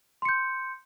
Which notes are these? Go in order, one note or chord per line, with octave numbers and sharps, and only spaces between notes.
C6 G6 C#7